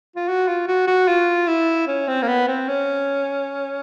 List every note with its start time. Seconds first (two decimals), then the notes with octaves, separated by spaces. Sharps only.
0.16 F4
0.28 F#4
0.48 F4
0.67 F#4
0.87 F#4
1.08 F4
1.48 E4
1.87 C#4
2.08 C4
2.22 A#3
2.28 B3
2.47 C4
2.68 C#4